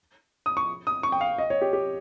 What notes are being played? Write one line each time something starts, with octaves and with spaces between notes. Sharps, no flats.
D#6
C#6
D#6
C#6
G5
F5
D#5
C#5
G4
G4